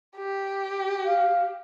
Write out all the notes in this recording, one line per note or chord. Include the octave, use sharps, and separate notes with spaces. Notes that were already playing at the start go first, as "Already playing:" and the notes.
G4
F5